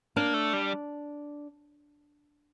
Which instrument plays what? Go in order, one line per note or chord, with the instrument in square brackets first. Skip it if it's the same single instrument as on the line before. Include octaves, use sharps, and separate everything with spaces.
[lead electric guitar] A#3 [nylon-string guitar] D4
[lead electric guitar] A3
G3